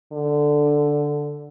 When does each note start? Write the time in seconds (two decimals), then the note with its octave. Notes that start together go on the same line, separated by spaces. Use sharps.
0.13 D3